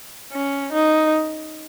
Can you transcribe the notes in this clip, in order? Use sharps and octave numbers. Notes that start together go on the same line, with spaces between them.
C#4
D#4